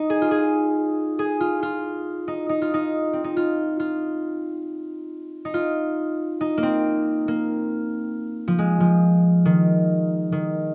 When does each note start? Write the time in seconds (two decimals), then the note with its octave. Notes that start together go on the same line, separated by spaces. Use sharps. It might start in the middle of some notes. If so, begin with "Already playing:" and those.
Already playing: D#4
0.10 G#4
0.22 F4
0.31 G#4
1.19 G#4
1.40 F4
1.63 F4
2.28 D#4
2.49 D#4
2.62 F4
2.74 D#4
3.13 C4
3.24 D#4
3.37 F4
3.80 F4
5.45 D#4
5.54 F4
6.41 D#4
6.57 A#3
6.63 C4
7.28 A#3
8.48 F3
8.58 G#3
8.80 F3
9.45 D#3
10.32 D#3